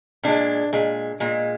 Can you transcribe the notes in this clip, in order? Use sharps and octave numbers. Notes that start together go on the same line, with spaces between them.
A#2 G#3 D4
A#2 G#3
A#2 G#3